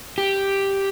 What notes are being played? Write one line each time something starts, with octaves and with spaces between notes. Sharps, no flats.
G4